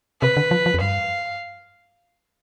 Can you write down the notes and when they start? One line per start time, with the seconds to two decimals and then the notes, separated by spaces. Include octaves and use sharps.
0.22 C3 B4
0.37 D3
0.51 F3
0.66 F3
0.74 F2
0.81 G2 F5